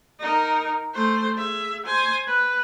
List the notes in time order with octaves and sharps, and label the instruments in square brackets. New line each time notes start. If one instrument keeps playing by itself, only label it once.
[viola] D#4 A#4
A3 C5
G#4 E5
C5 G#5
B4